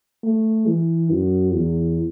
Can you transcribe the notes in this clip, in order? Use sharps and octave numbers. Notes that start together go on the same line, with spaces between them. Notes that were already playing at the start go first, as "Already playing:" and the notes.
A3
E3
F#2
E2